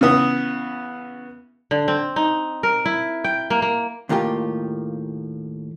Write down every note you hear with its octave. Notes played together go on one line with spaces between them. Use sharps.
C#3 E3 B3 D#6
D3
C4
D#4
A#4
E4
G5
A#3
A#3
D#2 A2 A#3 F4 G4